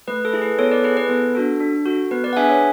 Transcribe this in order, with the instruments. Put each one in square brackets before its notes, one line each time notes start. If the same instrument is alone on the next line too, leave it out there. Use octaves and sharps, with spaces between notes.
[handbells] A3 B4
A4
E4 G#4
B4
B3 A4 C#5
B4 D5
E4 G#4 B4
B4
B3 A4
D4 F#4 A4
D4
F#4 A4
B3 B4
B4 D5
F#5
D4 G#4 E5 G#5
C#5 E5